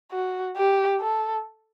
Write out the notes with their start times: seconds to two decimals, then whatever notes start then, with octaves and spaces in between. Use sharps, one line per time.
0.12 F#4
0.57 G4
1.00 A4